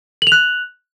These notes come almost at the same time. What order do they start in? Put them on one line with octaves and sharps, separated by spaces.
F#7 F7 F#6